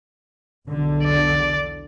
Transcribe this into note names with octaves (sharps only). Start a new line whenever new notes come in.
B1 E2 D3
D5